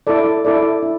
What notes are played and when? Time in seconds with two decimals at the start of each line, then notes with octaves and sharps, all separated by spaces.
0.07 E4 A4 D5
0.45 E4 A4 D5
0.83 E4